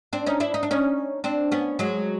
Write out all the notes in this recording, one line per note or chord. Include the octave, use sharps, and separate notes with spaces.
C4 D4
C#4 D#4
D4 E4
D#4
D4
C#4 D#4
C4 D4
B3 C#4
F#3 G#3